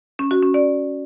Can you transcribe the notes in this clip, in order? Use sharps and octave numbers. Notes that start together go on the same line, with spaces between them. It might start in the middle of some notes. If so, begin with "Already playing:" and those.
C#4
F#4
C#4
D5